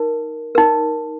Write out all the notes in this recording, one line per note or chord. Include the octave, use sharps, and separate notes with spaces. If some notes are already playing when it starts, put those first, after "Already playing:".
Already playing: D#4 A#4
D#4 A#4